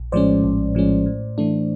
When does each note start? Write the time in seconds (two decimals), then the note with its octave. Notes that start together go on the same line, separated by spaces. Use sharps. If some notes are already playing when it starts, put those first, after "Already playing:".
Already playing: A#1
0.12 A2 F3 G#3 C#4 C5 D5
0.44 A#1
0.75 A2 F3 G#3 C#4
1.06 A2
1.38 E3 A3 D4